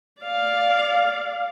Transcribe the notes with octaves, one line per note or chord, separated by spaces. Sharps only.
D5 F5